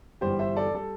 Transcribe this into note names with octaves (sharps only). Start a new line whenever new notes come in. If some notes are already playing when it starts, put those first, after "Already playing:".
G1 G2 E3 G3 G4 C5
C5 E5
A4 D5
G3 A4